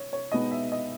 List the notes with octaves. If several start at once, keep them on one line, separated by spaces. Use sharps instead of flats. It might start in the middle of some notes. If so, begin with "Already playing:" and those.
Already playing: C#5
C#5
B2 G#3 B3 D#4 D#5
E5
D#5